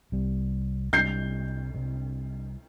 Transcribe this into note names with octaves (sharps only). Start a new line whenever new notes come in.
C2 C3 G3
C2 C3 G3 G6 C7
C2 C3 G3